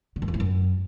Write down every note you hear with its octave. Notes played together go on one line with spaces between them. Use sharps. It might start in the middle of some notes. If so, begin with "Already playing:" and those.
D3
F#2
F2
A2
F#2